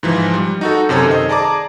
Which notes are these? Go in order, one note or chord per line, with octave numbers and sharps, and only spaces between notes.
G#2 E3 F3
G3
D#4 F#4 A4
F#2 C3 A4 C#5 G#6
D#3 C5 D#5
G#4 D5 A5 A#5 D6